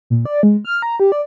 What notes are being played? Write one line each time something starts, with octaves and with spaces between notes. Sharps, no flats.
A#2
D5
G#3
F6
A#5
G4
D5